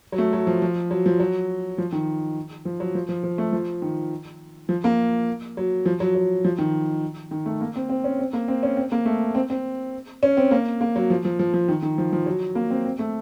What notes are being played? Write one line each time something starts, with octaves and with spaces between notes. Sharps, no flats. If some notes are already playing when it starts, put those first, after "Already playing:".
F#3
A3
F#3
F3
F3
F#3
F3
F#3
F3
D#3
F3
F#3
F3
F3
F3
A3
F3
D#3
F3
A#3
F#3
F3
F#3
F#3
F3
D#3
D#3
A3
A#3
C4
C4
C#4
C4
A#3
C4
C#4
C4
A#3
A3
C4
C4
C#4
C4
A#3
A#3
F#3
F3
F3
F3
F3
D#3
D#3
F3
F3
F#3
A#3
C4
C4
A3